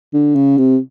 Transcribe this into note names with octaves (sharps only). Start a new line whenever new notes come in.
D3
C#3
C3